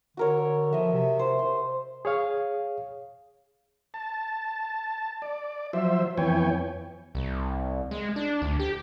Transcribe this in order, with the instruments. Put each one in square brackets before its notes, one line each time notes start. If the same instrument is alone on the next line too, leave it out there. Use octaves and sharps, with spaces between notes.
[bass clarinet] D3 [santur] F#4 A#4 C#5
[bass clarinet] F3 [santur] D#5 E5
[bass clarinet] C3
[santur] C5
C6
[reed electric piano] G#4 C#5 F5
[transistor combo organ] A5
D5
F3 F#3 C5 E5
F2 E3 B3 C#5 G5 G#5
[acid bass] C2
G#3
D4
D2
G4